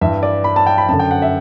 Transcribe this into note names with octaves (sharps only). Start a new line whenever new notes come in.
G2 E3 E5
D5
B5
A5
G5
B5
F#2 D3 A5
G5
F#5
E5